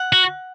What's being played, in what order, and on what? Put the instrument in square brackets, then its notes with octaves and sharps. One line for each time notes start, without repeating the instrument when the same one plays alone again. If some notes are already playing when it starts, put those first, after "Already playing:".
Already playing: [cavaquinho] F#5
[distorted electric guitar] F#4